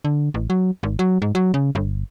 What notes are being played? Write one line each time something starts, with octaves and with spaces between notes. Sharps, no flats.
D3
A1
F#3
G#1
F#3
G#2
F#3
C#3
G1